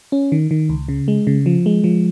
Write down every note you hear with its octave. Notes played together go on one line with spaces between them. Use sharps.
C#4
D#3
D#3
C#2
C#3
G#3
C#3
F3
G#3
F3